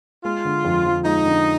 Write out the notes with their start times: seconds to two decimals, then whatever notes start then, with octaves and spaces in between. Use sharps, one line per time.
0.25 G#3 F4
0.45 D3
0.65 F2
0.85 F3
1.05 G#3 D#4
1.26 D3